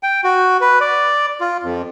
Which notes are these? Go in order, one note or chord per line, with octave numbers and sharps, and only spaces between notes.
G5
F#4
B4
D5
F4
F2